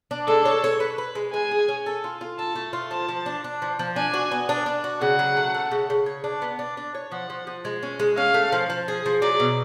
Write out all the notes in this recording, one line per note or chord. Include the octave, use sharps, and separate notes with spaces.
D4
G#3 A4
C#5
C#5
B4
B4
G#3
G#3 G#5
G#4
C#4
A4
F4
F4
A4 A5
A3
F4
F3 A5
F3
D4
D4
F3
F3
D4 G#5
F#4
B3
D4
D4
F#4
C#3 F#5
F#3
A3
A3
C#3
C#3
C#5
D4
B3
D4
D4
C#5
F3 F#5
F3
F3
G#3
C#4
G#3
C#4 F5
A3
F3
F3
G#4
F3
F#3 D5
B2